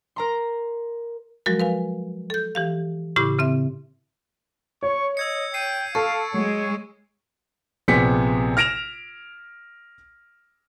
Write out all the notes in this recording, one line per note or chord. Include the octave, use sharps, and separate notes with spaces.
A#4 A#5 C6
F3 F#3 G#3 F#4 A#4
B4 F5 G#5
A4 G6
E3 G4 F5
A2 C#3 E4 G4 B5 D6
C#3 C4 E5
C#5 C#6
D#5 E6 G#6 C#7
G5 C7 D#7
A4 F5 C#6
F#3 G#3 C#5
A#1 C3 B3 G#4 B6 C#7
F6 A#6 D7 E7 F7